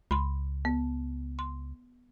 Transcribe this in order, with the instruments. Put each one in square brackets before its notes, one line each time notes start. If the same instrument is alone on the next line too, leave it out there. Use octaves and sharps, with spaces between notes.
[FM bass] C#2 [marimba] B5 C6
[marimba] B3
C6